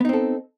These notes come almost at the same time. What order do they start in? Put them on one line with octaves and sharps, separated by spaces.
B3 D#4 C4 A4